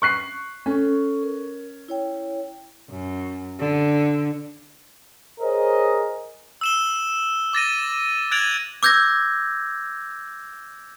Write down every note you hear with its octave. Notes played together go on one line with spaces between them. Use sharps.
C#6 F#6 C7
C#4 A4 C#6
A#4
E4 C#5 G5
F#2
D3
G#4 A#4 C5 C#5 D#5
E6 E7 G7
D6 A6 A#6 D#7
F#6 G#6 A6 D7 F7 F#7
D6 E6 G6 G#6 A#6